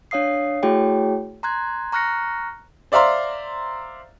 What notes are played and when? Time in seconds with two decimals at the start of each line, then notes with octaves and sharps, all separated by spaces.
0.11 D4 C#5 F5 D#6 C7
0.63 A3 E4 F#4 G#4 C#5 G5
1.43 A#5 C6 F#6 G#6
1.92 A#5 C#6 F6 F#6 A#6 C#7
2.92 C5 D5 E5 F5 A#5 C6